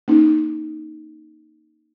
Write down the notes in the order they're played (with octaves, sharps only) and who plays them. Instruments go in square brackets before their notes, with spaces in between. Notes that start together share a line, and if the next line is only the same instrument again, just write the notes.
[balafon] A#3 C#4 D#4